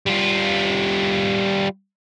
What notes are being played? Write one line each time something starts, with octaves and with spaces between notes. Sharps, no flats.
G3 F4